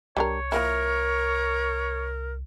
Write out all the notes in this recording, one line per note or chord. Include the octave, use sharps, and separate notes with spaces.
C2 G3 D4 A#4 C#5
F3 A#3 E4 A#4